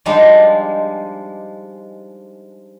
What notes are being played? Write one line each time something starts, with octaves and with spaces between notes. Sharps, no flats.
F3 G3 G#3 D4 D#4